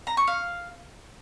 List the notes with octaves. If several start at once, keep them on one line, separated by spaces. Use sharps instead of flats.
A#5
C#6
F5